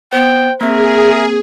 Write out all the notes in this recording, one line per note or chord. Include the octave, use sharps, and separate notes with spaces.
B3 C5 G5
A#3 C4 G#4 A#4 E5